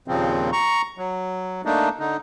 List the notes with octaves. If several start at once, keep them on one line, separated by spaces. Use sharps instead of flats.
D#2 A#2 C#3 F3 C4
A#5 C#6
F#3
A3 A#3 D4 D#4
D3 D#4